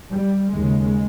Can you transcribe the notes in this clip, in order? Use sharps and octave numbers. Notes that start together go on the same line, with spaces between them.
G3
D#2 C#3 G#3